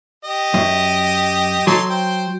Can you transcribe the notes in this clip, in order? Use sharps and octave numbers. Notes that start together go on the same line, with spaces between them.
G4 D#5
F#2
F#3 D#4 A4 C6
C5 G5